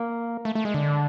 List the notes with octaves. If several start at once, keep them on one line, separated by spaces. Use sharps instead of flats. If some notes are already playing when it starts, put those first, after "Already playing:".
Already playing: A#3
A3
A3
G#3
D3